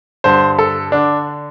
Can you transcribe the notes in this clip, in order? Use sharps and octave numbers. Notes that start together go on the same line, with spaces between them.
G2 D3 C5
A4
D3 D4